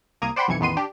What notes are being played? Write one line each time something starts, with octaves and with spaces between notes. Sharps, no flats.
C2 A#3 A#5 D#6 G#6
C5 D5 F#5 G5 B5 C6
B1 F2 E3 G#6 C#7
A1 E2 D#3 B3 C6 D#7
D4 G4